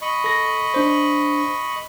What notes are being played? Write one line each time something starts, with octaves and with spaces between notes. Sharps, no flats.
D#5 B5 C#6
A4 A#6
D4 C5